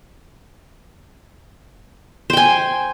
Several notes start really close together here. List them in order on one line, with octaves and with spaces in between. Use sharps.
C5 G5 G#5